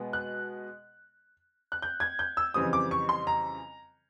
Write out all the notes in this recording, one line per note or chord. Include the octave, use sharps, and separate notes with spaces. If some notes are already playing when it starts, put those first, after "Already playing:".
Already playing: B2 G#3 B3
F#6
F#6
G6
G#6
G6
E6
F2 C#3 E3 G3 C4 D#6
D6
C#6
C6
A#5